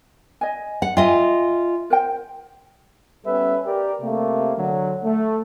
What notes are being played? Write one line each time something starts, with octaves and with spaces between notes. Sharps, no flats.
D#5 G#5
F#5
F4 D#5 E5 G5 G#5
A#4 C5 G5
G3 B3 C#4 A4 B4 E5
G4 A#4 D5
C3 A3 A#3
D3 F#3
A3